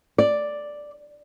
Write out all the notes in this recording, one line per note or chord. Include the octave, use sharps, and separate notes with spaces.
D5